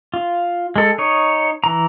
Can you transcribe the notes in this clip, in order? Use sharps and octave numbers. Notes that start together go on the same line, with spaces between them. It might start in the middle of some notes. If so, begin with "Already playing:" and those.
F4
G#3 A4
D#4 C#5
E3 A#5